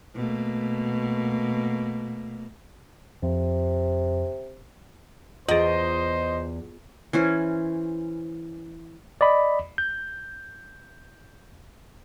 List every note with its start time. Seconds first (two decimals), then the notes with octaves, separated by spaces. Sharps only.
0.15 B2 A3 A#3
3.23 F2 C3
5.49 E2 F4 G#4 C5 D#5
7.13 E3 C#4 C5
9.21 D5 D#5 B5
9.78 G6